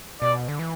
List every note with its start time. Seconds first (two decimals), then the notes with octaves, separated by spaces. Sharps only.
0.22 B2 D5
0.48 D3
0.59 E3